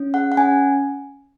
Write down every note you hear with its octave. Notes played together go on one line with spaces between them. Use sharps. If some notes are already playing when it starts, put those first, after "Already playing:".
Already playing: C#4
G#4 F#5
F#5
C#4 G#5